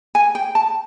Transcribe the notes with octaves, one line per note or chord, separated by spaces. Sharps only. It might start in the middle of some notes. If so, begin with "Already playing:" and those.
G#5
G5
A5